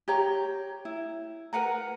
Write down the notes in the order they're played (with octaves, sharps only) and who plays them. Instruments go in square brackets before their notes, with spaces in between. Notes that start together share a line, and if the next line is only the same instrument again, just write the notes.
[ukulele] G4 C#5 A#5
E4
A#4 B4 F#5 A#5